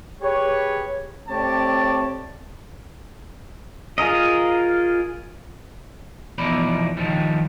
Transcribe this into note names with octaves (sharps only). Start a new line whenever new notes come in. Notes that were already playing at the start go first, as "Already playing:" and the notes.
G4 G#4 B4 C#5
A3 C4 G4 C#5 D5 A5
F4 G#4 A#4 D#5
E2 B2 F3 D#4 D5 B5
D#3 F3 G3